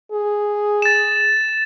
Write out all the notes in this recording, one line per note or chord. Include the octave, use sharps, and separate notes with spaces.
G#4
A6 E7